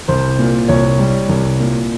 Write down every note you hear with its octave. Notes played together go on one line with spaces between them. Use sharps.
C2 C5
A#2
C2 C#5
G3
C2
A#2